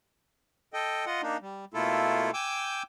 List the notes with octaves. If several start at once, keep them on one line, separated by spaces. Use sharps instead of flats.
A4 D#5 G5
F4 D#5 F#5
A#3 D4 D#4
G3
B2 A3 A#3 E4 F4 A4
G5 G#5 D6 E6 G6